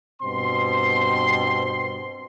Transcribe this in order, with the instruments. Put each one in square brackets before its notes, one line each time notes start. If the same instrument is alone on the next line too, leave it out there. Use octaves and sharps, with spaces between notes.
[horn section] G2 B2 C4 C6